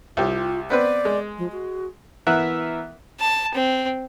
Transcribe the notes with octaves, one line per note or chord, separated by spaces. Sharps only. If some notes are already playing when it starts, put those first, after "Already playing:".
C2 F4 G4
B3 C4 B4 D5
G#3
F3
F#4
E3 B3 A#4 E5 F#6
A5
C4